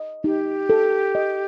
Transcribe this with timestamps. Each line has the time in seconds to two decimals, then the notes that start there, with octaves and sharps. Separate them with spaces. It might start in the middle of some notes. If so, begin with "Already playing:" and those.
Already playing: D#5
0.24 D#4 G4
0.70 A4
1.15 D#5